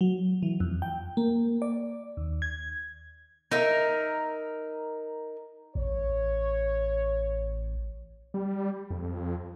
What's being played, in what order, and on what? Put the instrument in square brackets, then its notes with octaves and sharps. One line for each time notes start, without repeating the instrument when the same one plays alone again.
[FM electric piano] F#3
E3
F2
G5
A#3
D5
D#2
G#6
[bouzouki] D#4 A#4 E5
[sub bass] A1 [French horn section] C#5
[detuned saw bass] G3
F2